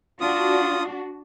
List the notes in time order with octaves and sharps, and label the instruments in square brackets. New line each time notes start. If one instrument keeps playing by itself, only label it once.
[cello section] D4 F#4 [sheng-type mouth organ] F4 D#6